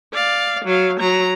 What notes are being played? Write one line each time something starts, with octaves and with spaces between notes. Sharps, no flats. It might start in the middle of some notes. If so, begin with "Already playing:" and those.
D5 F5
F#3 F5
F#3 A#5